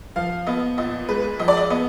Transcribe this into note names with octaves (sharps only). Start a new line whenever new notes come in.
F3 F5
B3 D#5
A#2 D#5
G#3 B4
F3 D#5
D5
D#5
B3 D#5